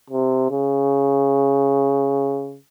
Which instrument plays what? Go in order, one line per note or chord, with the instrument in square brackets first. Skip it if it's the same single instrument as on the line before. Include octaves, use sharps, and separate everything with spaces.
[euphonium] C3
C#3